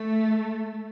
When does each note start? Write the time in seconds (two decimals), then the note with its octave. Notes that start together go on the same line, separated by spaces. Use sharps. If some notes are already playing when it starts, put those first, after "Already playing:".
Already playing: A3